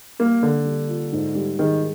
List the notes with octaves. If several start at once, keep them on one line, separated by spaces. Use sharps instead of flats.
G3 A#3
D3 A#3
G3
F4
G#2
G3
D#3 G#4